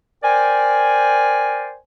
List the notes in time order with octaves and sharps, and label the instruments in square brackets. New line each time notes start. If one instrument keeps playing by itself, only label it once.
[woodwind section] A#4 C5 D5 G5 G#5